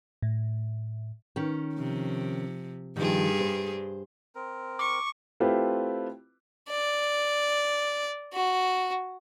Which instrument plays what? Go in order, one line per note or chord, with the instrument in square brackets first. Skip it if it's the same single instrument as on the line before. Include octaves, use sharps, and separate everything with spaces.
[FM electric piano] A2
[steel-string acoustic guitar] D#3 C#4
[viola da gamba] C3 F3
[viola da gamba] G2 G3 G#4 [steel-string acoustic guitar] D#3 F3
[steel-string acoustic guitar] C5
[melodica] C4 A#4
[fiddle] C#6 [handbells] D6
[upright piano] A3 C4 E4 F4 G4 B4
[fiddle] D5
F#4